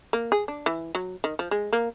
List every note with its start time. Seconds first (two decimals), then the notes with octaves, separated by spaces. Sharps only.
0.13 A#3
0.32 G#4
0.48 D4
0.66 E3
0.95 F#3
1.24 D#3
1.39 F3
1.51 G#3
1.73 A#3